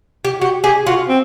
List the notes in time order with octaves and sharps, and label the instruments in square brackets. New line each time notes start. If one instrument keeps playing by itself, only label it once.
[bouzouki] G4
[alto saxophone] F#4 [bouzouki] G4
[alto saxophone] G4 [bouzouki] G#4
[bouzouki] F4 [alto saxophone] F#4
[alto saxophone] C4